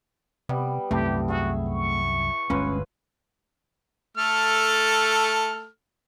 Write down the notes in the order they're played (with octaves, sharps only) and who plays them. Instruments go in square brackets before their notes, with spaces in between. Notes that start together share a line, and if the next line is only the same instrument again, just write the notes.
[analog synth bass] C3 [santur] G3 B3 G4
[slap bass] C2 F#2 C4 [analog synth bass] A3 [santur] E4 A5 [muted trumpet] G4
[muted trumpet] F#4 [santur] G#4 E5
[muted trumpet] C#6
[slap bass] G1 D2 G#3 [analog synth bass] C#4 [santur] F4 B4 C#5
[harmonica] A3 A4 F6